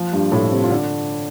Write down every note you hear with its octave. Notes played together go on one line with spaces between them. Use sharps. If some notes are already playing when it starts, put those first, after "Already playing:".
Already playing: F3
G2 G3
A2 A3
C3 C4
F4
D3 D4